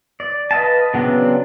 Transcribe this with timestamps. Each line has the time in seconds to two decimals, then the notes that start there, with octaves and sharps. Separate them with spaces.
0.20 D5
0.51 B4 D#5 F5 A5
0.94 C#3 F#3 B3 C4 D4